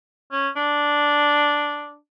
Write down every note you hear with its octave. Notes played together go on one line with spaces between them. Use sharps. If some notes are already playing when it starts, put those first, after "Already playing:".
C#4
D4